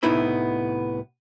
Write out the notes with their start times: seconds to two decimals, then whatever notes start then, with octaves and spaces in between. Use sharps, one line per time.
0.03 C2 A2 B3 D#4 E4 B5